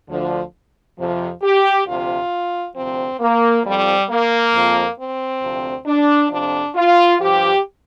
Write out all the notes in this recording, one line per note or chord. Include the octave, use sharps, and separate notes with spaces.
D2 D3 F3
F2 C3 F3
G4
D2 C3 F3 F4
D2 C3 F3 C4
A#3
F2 F3 G3
A#3
F2 F3
C4
D2 C3 F3
D4
F2 C3 F3 D4
F4
G2 F3 G4